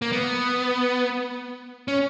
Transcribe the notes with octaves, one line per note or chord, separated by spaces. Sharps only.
A#3
B3
C#4